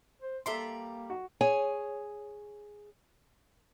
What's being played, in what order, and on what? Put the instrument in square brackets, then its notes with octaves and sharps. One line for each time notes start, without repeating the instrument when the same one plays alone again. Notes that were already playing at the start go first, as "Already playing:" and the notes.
[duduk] C5
[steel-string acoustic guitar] G3 D5 A#5 [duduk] A#3 [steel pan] A4 E5 C6
[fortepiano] F#4
[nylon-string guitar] G#4 C#5 G#5